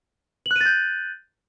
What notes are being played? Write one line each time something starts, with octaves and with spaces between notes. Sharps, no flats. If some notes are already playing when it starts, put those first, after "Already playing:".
F#6 G6 A6 D#7 F#7